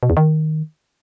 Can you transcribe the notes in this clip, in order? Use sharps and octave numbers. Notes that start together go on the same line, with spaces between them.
B2
E2
D#3